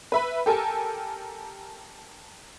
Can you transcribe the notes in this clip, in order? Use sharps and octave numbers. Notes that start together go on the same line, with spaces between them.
B4 E5 B5
G4 A4 A#4 G#5 A5